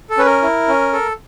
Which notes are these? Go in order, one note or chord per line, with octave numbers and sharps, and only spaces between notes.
A4
C#4 B4
A#4
E4
C#4
A4